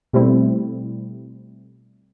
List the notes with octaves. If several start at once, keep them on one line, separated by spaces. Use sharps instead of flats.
B2 G3 A3 C4 E4